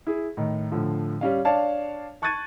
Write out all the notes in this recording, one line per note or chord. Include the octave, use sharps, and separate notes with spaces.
E4 G#4
A2 D#3
A2 D3 F3
G3 C#4 F5
D4 C#5 D5 F5 A5
A5 C#6 F#6 G#6 A6 D#7